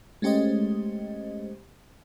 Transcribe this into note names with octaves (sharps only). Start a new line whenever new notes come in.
G#3 A3 C#4 G4 C5 D#5